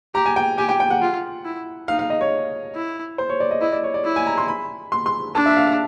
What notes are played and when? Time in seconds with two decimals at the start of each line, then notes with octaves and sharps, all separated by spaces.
0.15 G4 A#5
0.26 G#5
0.36 G5
0.58 G4 G#5
0.69 G5
0.80 G5
0.90 F#5
1.02 F4
1.45 E4
1.88 D#4 F5
1.99 F5
2.10 D#5
2.21 C#5
2.75 E4
3.18 C5
3.30 C#5
3.40 D5
3.51 D#5
3.61 E4 D#5
3.72 D5
3.84 C#5
3.94 D5
4.05 E4
4.16 G#5
4.27 A#5
4.38 C6
4.48 B5
4.92 C6
5.06 C6
5.35 D4 A5
5.46 E5
5.57 F5
5.67 F5